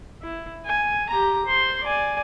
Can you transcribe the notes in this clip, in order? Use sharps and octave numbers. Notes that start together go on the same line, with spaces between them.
E4
G#5
G4 A#5
C5 C6
D5 G#5